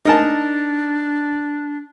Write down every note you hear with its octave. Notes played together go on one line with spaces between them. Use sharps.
D4 D#4 A#4 A5